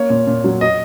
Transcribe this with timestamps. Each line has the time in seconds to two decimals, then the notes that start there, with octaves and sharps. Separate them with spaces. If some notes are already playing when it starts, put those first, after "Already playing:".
Already playing: A#3 C#5
0.10 A#2
0.27 A#2
0.44 F#3
0.61 D#5